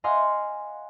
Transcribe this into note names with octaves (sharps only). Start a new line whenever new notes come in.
D#5 F5 F#5 G#5 C6 D#6